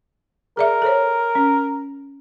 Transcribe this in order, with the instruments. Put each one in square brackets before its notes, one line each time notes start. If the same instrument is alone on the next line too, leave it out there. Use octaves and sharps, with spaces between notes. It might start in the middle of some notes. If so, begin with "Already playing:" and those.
[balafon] G#4 D5 E5 [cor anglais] A#4
[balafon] A4 C5 C#5
C#4